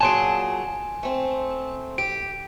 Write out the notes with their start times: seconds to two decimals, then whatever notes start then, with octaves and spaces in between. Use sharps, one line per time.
0.01 A#2 F#3 G#4 G#5 A5 C6 D7
1.03 A3 C4
1.98 G4 D7